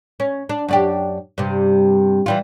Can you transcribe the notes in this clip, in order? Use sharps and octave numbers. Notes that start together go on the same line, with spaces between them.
C#4
D4
F#2 D4 G4
G2 C3
E3 G3 F4